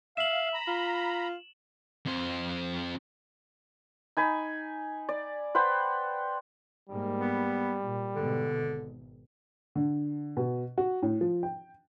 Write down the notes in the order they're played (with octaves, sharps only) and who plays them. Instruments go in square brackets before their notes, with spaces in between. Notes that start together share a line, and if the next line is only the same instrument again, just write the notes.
[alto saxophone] E5 [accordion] F5 [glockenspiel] E7 F#7
[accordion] A#5 B5
[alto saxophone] F4
[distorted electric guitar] F2 C5
[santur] D#4 G#5 B5
D5
B4 C5 F#5 G5
[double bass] G#2 A#3 [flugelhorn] G3
[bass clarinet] B3
[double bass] A#2
[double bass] G#2 B2 [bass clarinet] D3
[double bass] G#1
[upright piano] D3
B2
F#4
A2
F3
G5